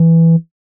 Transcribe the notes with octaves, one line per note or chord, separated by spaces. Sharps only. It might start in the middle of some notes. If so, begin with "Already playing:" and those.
Already playing: E3